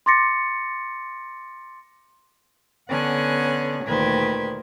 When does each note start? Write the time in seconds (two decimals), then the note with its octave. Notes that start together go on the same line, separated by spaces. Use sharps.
0.06 C6 D6 A6 A#6 C#7
2.89 D3 B3 C#4 F#5 G#5 F#6
3.85 D2 A#2 D#3 B4 C5 G#6